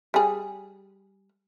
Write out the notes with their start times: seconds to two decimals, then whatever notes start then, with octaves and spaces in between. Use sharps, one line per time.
0.14 G3 G#4